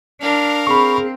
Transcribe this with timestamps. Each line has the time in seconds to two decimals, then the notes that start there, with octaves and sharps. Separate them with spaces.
0.21 D4 A#4 F5
0.67 C4 G#4 B5 C#6